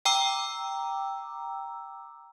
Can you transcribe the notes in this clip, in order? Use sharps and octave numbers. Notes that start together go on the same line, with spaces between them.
G5 A#5 D6 E6